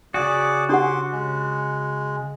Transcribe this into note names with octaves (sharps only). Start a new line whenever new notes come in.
C#3 F#4 G#4 D5 D6
D4 G4 F#5 C6 D6
G#3